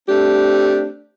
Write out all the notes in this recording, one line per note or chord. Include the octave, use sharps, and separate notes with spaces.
A3 C4 D4 G4